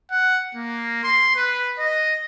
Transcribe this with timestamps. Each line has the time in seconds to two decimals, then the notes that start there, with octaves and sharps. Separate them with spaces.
0.11 F#5
0.55 A#3
1.04 C6
1.36 B4
1.79 D#5